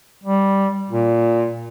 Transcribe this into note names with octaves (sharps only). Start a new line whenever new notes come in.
G3
A#2